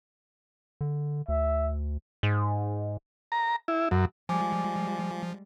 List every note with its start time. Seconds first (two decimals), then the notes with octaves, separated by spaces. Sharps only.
0.81 D3
1.29 D2 E5
2.23 G#2
3.32 A#5
3.68 E4
3.91 F#2
4.29 F3 G3 G#3 G#5 D6